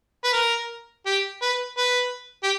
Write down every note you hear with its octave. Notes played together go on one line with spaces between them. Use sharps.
B4
A#4
G4
B4
B4
G4